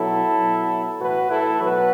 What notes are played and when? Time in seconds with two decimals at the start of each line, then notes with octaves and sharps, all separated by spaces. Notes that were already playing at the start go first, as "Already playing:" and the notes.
Already playing: B2 F#3 E4 A4
0.37 B2 F#3
0.99 A2 E3 F#4 B4
1.30 E4 A4
1.61 B2 F#3 F#4 B4